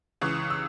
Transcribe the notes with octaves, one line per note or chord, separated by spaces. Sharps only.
C#2 C#3 E3 C#6
E6